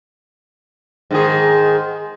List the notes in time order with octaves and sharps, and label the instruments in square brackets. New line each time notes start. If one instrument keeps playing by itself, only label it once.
[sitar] G#2 D#3 G#4